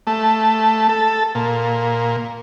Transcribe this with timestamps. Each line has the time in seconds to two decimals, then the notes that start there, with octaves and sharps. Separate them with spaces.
0.07 A3
0.89 A4
1.35 A#2